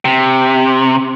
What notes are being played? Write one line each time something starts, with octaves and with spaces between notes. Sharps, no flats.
C3